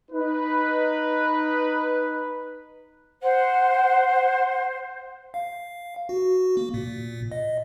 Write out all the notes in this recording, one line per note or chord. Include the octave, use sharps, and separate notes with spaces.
D#4 B4
C5 F#5
F5
F#4
A#3
A#2
D#5